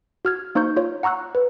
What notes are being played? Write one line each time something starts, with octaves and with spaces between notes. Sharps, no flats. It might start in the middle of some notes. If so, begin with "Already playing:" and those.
F#4 F6 G#6
A#3 D#4 C5 C#6 G6
F4 C#5
F#5 A#5 C#6 E6 F#6
B4